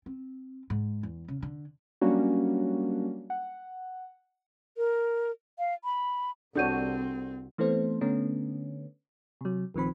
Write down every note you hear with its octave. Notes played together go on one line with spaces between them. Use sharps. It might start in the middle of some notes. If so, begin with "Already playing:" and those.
C4
G#2
E2
C#3
D3
F#3 G3 A#3 C#4 D4 F#4
F#5
A#4
F5
B5
C2 C4 D4 F#4 A4 C#5 G6 D#7
E3 A3 B3 C4 A4 C5
D3 A3 B3 C#4
C3 F#3
A#1 D#3 F3 C4 B5